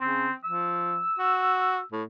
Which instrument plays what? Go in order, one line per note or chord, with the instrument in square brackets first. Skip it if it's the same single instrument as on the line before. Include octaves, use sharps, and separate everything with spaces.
[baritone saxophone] C#3 [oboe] C4
[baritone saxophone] F3 [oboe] E6
[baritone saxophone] F#4
A2